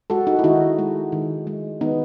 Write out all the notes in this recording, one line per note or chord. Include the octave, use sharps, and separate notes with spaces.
G#3 F#4 A4
D#4 F#4
E4
D#3 D#4 F#4
G#3
D#3
G#3
D#3 B3 D#4